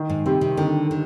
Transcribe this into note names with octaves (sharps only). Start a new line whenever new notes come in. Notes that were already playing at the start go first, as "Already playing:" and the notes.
Already playing: D#3
G#2
C3 G3 C4 G4
C3
D3 D#3
D3